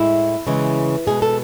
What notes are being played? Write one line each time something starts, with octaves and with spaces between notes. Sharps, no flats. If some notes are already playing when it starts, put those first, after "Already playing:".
Already playing: A2 G#3 E4
C#3 E3 G#3
B2 G#3 G#4
A4